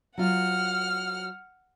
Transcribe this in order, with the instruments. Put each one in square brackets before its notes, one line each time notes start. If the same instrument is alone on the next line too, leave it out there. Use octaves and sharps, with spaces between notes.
[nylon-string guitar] F#3 F4 [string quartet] F#5 F6